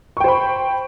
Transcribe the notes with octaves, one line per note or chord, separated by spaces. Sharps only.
C5 G5 B5 C#6